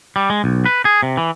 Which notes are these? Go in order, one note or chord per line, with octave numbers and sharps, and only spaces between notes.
G3
G#3
B1
B4
G#4
C3
E3